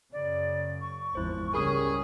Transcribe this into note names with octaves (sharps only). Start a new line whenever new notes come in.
F#2 C#3 D5
C#6
G#1 E2 F3 E4 C5
C#2 G3 C#4 G#4 A#4 B5 D#6